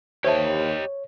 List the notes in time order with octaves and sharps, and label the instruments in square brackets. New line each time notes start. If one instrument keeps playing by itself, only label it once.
[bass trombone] D#2 [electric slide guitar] G4 D#5 [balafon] C5 E5 A5 [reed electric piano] C#5